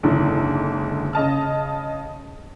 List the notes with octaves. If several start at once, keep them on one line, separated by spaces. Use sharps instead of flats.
F#1 G#2 D3 E3
C#3 D#5 A5 F6